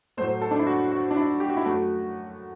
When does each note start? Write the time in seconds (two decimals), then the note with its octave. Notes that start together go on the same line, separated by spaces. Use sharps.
0.17 A2 F#3 A3 C5
0.41 A4
0.51 D4
0.59 E4
0.66 F#4
0.91 F#4
1.10 D4
1.17 E4
1.40 G4
1.49 F#4
1.57 E4
1.65 F#2 F#3 A3 F#4